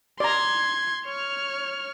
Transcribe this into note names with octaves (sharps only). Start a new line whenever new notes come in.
D5 A#5 C6 G#6
C#5 F6